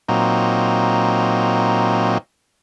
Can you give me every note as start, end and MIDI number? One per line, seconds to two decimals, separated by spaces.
0.08 2.18 46
0.08 2.18 54
0.08 2.18 60
0.08 2.18 63